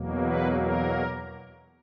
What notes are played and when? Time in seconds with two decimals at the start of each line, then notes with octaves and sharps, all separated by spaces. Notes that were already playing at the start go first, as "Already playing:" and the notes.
Already playing: E2 B2 F#3 A#3
0.23 B4
0.59 A#4